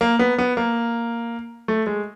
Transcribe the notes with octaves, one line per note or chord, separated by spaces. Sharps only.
A#3
B3
B3
A#3
A3
G#3